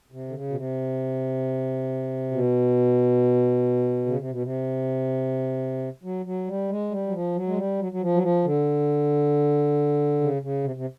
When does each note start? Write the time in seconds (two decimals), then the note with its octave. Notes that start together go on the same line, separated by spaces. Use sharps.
0.12 C3
0.29 D3
0.33 C#3
0.49 B2
0.55 C3
2.32 B2
4.06 C#3
4.19 C3
4.31 B2
4.42 C3
6.03 F#3
6.26 F#3
6.47 G3
6.70 G#3
6.91 G3
7.07 F#3
7.13 F3
7.36 F#3
7.47 G#3
7.57 G3
7.80 F#3
7.92 F#3
8.01 F3
8.14 F#3
8.22 F3
8.45 D3
10.21 C#3
10.42 C#3
10.64 C3
10.76 C3